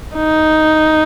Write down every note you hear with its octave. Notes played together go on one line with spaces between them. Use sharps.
D#4